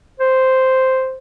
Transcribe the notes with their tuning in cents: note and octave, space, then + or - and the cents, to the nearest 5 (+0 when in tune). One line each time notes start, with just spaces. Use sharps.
C5 -5